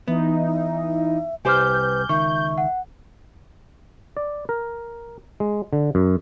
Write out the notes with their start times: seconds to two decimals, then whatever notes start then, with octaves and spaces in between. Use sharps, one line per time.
0.08 E3 B3 D#4 E5
1.45 C2 G4 B4 C5 G#5 D6 F6 G6
2.09 C#2 D#3 E5 C#6
2.58 F#5
4.17 D5
4.49 A#4
5.40 G#3
5.73 D3
5.95 F#2